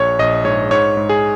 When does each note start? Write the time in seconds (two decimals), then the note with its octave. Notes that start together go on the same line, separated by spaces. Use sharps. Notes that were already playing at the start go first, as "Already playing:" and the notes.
Already playing: A#1 C#5
0.19 A#1 D#5
0.44 G#2 C#5
0.71 G#2 C#5
0.97 G#2
1.09 G#4